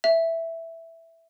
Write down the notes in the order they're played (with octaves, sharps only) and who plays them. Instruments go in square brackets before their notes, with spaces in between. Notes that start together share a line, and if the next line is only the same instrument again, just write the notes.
[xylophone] E5